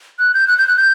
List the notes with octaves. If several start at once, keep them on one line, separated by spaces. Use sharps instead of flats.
F#6
G6
F#6
G6
F#6
G6